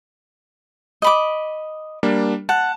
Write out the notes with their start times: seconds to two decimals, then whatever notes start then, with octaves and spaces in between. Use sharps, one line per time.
1.02 D#5 B5 D6
2.03 G3 A#3 D4
2.49 F#5 A5